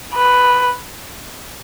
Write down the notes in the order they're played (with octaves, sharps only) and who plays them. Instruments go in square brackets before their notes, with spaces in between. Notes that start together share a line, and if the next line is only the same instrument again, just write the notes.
[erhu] B4